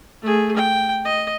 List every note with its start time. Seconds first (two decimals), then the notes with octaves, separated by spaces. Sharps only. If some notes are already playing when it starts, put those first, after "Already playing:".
0.22 A3 G#4
0.56 G5
1.05 D#5